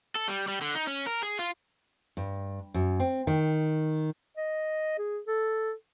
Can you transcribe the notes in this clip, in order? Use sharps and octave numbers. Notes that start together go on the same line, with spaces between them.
A4
G3
G3
D3
D#4
C#4
A#4
G#4
F4
G2
F#2
C4
D#3
D#5
G#4
A4